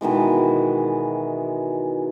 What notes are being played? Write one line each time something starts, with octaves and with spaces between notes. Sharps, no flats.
B2 D#3 E3 G#3